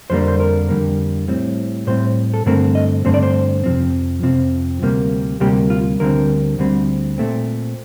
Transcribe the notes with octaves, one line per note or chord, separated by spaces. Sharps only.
F2 D3 G3 A#3 C5
C5
A#4
F2 D3 G3 A#3
A2 G3 C4
A2 G3 C4 C5
A4
G2 D3 A3 C4 A#4
D#5
G2 D3 A3 C4 C5
D5
C5
F2 C3 F3 C4
F2 C3 F3 C4
D2 C3 G3 A#3
D2 C3 G3 A#3 G4
F4
D2 D3 G3 C4 A#4
D2 D3 G3 C4
A#2 A3 C4